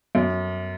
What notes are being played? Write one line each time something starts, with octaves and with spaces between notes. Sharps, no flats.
F#2